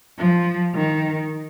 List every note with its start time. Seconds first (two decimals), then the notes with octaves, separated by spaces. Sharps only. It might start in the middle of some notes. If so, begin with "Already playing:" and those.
0.18 F3
0.74 D#3